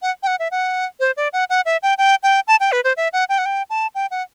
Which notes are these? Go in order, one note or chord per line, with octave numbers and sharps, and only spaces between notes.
F#5
G5
F#5
E5
F#5
C5
D5
F#5
F#5
E5
G5
G5
G5
A5
G5
B4
C5
E5
F#5
G5
F#5
G5
A5
G5
F#5